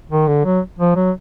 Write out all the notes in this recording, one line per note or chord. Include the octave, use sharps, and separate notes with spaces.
D#3
D3
F#3
F3
F#3